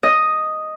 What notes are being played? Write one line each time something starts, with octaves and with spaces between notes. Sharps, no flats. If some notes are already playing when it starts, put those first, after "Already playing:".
D#5